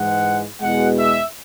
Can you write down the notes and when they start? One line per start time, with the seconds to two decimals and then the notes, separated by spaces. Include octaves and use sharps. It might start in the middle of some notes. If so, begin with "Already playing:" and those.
Already playing: G#2 E3 G#3 F#5
0.60 E2 B2 G#3 F#5
0.98 E5